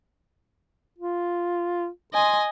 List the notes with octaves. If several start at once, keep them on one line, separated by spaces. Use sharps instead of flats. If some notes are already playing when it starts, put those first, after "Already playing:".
F4
D#5 G#5 C6